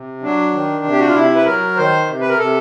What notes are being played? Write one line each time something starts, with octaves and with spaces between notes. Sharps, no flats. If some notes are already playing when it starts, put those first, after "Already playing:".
Already playing: C3
F#3 D4
D#3
C3
G4
F#4
F4
C3 E4
B4
F#3 A#4
D#3 C5
C3
B4
A#4
C3 A4